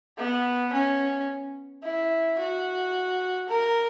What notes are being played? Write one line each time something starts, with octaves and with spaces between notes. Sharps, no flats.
B3
C#4
E4
F#4
A#4